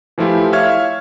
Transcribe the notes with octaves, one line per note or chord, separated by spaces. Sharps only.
E3 F3 A3 E4 F4 G4
C#5 E5 F5 C#6 F6 G#6